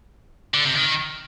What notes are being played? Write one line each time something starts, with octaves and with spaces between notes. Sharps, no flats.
D3
C3
D#3